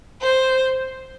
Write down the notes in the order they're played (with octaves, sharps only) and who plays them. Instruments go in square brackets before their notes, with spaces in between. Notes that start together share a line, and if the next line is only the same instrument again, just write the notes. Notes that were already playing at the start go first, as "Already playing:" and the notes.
[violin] C5